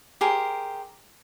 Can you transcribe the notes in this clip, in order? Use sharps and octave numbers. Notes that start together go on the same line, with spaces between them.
G4 G#4 A#4 C5